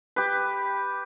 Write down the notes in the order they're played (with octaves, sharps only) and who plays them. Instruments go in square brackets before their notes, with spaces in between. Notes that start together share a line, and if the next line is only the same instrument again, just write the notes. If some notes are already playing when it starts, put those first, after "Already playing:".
[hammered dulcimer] G4 B4